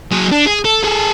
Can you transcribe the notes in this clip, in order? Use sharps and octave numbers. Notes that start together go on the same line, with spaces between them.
F#3 G#4
D4
G#4
A4
G#4 A4